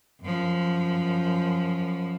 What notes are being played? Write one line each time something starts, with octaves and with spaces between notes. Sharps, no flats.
F#2 F3